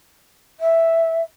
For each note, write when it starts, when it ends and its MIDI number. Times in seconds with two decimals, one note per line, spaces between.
0.60 1.21 76